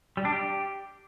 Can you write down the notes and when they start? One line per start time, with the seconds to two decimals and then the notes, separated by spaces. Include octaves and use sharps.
0.17 G3
0.25 D4
0.33 G4